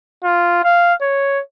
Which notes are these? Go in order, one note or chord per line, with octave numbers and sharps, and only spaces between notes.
F4
F5
C#5